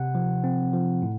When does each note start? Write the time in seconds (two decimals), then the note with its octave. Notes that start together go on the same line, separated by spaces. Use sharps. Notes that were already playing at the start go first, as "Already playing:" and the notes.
Already playing: C3 F#5
0.15 F3
0.44 C4
0.73 F3
1.02 A2